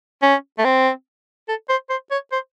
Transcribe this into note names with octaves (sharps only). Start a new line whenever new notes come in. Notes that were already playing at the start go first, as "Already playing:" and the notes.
C#4
A3
C4
A4
C5
C5
C#5
C5